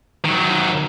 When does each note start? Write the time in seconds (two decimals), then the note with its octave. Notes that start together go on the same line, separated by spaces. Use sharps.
0.25 D#3 F#3